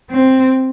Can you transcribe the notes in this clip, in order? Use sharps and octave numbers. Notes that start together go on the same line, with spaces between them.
C4